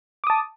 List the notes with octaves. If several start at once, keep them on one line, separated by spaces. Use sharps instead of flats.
A5 D6 D#6